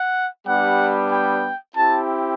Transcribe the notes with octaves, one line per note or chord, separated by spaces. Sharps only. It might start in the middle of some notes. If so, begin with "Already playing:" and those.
Already playing: F#5
G3 B3 D4 G4 F#5
G5
C4 E4 G4 A5